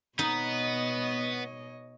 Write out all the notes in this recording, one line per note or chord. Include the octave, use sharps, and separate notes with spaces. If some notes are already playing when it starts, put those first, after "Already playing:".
B2 B3 D#4 C#5 D#5